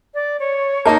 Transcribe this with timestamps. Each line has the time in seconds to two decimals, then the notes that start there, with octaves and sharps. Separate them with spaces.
0.14 D5
0.40 C#5
0.85 A#3 D#4 A5 A#5